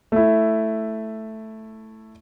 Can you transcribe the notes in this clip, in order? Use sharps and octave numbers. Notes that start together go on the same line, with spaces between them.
A3 E4